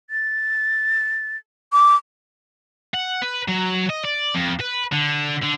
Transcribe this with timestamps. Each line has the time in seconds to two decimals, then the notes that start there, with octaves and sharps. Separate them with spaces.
0.10 A6
1.73 D6
2.94 F#5
3.22 B4
3.48 F#3
3.90 D#5
4.05 D5
4.35 F2
4.60 B4
4.92 D3
5.43 D3